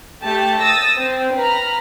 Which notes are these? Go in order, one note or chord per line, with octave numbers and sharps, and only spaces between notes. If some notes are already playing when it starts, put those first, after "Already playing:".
A3 G4 A5
D#6 E6 A6 A#6
C4
B4 A#5 B5 F6